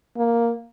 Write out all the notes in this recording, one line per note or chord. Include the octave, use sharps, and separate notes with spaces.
A#3